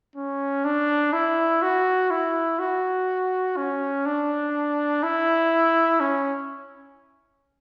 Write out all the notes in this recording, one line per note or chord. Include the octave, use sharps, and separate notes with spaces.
C#4
D4
E4
F#4
E4
F#4
C#4
D4
E4
C#4